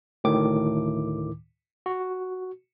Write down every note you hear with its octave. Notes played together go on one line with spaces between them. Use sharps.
D2 A2 D#3 D6
F#4